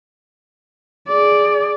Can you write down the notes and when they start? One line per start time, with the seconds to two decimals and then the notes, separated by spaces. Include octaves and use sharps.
1.08 G#4 D5